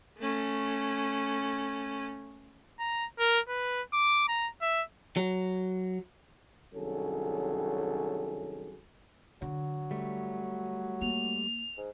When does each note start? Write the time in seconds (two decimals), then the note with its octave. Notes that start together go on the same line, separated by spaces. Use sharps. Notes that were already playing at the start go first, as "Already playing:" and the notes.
0.18 A3 C#4
2.79 A#5
3.19 A#4
3.48 B4
3.93 D6
4.28 A#5
4.61 E5
5.17 F#3
6.74 C2 D#3 F#3 C#4 G#4 A4
9.42 D3 F#3
9.91 G3 A3
11.01 A#3 F7
11.77 G#2